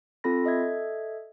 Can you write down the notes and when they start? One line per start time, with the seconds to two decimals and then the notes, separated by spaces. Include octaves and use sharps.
0.24 C4 F4 A4 B5 A#6
0.44 A4 D#5 E5 G#6